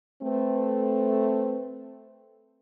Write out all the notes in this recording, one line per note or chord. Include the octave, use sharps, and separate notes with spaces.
A3 C4 B4